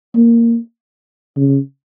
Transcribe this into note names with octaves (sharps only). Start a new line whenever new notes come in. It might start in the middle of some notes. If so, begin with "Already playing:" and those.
A#3
C#3